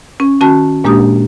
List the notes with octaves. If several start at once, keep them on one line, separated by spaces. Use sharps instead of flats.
C#4
D#3 C#4 F#4 A5
A#2 G#3 A#3 D4 G4 D#6